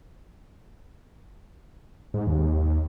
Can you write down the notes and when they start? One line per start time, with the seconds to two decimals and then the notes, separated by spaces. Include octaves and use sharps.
2.14 G#2
2.27 D#2